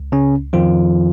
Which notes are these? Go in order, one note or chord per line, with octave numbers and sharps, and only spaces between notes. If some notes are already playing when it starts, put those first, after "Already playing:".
Already playing: C#2
C#3 C#4
F2 D#3 F3 F4